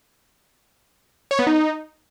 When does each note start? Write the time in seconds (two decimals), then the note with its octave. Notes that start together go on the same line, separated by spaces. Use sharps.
1.31 C#5
1.39 B3
1.47 D#4